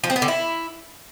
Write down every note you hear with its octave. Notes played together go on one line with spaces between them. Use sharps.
F3
C4
B3
D3
E4